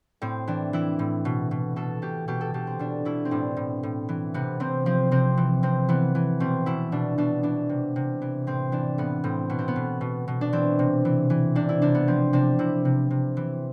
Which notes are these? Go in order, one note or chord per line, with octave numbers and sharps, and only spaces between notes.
A2 C4
E3 D4
E3 E4
A2
B2
B2
B2 A4
B2 G4
B2 G4
A4
B2 G4
C4
B2 D4
B2 E4
C4
A2 D4
A2
A2
E3
C3 B3
C3 C4
F3 C4
C3 C4
E3
C3 C4
E3 B3
E3
B2 C4
B2 E4
B2 D4
B2 D4
E3 D4
C3
C3
E3
A2 C4
E3 D4
A2 B3
A2 C4
B2 B3
C4
B3
B2
B2
B2
D4
E3 C4
C3
E3
E3
C3 D4
E4
C3 D4
B3
F3 C4
C3 D4
C3 E4
C3
C3
E3